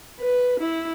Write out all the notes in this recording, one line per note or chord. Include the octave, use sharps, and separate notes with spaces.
B4
E4